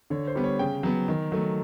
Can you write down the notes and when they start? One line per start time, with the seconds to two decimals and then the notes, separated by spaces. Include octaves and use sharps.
0.10 D3 C#5
0.27 C5
0.35 G3 B3
0.44 C#5
0.59 C#3 G5
0.83 F#3 B3
1.08 D#3
1.32 F#3 A3